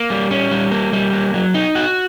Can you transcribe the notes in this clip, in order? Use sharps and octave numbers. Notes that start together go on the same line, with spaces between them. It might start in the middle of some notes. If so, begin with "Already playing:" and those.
Already playing: A#3
G3
C#4
G3
A#3
G3
A#3
F#3
D#4
F#4